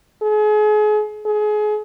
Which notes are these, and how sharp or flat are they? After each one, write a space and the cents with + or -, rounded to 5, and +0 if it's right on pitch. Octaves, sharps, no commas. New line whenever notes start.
G#4 +35
G#4 +30